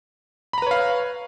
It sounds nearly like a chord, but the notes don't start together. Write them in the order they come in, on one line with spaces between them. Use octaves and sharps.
B5 A#5 B4 C#5 F5